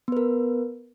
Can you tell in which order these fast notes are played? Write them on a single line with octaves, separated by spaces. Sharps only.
B3 B4 A#4